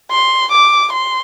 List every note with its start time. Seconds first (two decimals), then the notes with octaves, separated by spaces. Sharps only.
0.11 C6
0.51 D6
0.92 C6